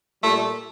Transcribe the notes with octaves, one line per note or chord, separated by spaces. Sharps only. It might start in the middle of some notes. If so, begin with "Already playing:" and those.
A#2 G3 A3